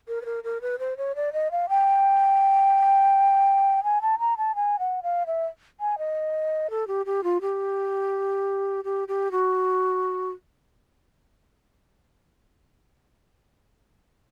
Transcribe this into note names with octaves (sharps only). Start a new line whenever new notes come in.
A#4
B4
A#4
A#4
B4
C5
C#5
D5
D#5
F5
G5
G#5
A5
A#5
A5
G#5
F#5
F5
E5
G#5
D#5
A4
G4
G4
F4
G4
G4
G4
F#4